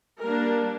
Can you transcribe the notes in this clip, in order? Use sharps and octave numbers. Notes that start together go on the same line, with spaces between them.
G3 A#3 D4 A#4